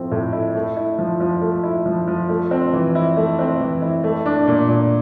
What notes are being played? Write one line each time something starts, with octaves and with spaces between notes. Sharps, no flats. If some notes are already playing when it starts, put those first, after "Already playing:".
Already playing: A2 F3 C4
A2
E4
A3
E4
F3
F3
A3
E4
F3
F3
A3
C4
E3
E4
A3
C4
E3
E4
A3
D4
A#2
A#2